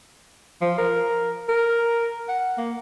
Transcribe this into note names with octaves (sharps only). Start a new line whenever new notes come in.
F3
A#4
A#4
F#5
A#3